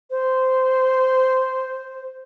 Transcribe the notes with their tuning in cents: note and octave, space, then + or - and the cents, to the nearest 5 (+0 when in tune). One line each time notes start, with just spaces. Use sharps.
C5 -10